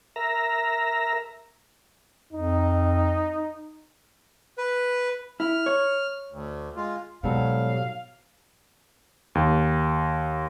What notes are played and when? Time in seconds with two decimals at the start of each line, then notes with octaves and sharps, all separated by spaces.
0.16 A#4 E5 A#5
2.33 F2 D#4
4.58 B4
5.40 E4 F6
5.66 C#5
6.32 D2
6.76 G#3 F4
7.23 G#2 B2 F#3 G3 A4 F5
9.35 D#2